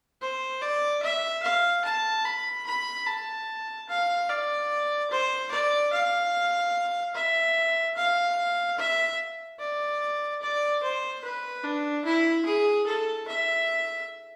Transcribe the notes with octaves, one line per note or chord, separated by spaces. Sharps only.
C5
D5
E5
F5
A5
B5
B5
A5
F5
D5
C5
D5
F5
E5
F5
E5
D5
D5
C5
B4
D4
E4
G#4
A4
E5